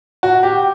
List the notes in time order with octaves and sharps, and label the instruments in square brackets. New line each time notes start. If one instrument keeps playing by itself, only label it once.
[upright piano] F#4
G4